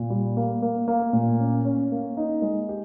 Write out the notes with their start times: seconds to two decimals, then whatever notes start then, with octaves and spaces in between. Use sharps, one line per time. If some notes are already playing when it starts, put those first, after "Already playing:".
Already playing: A#2
0.10 G3
0.37 A#3
0.62 A#3
0.88 A#3
1.13 A#2
1.40 C#4
1.65 C#4
1.92 A#3
2.17 D#4
2.42 G#3
2.69 G4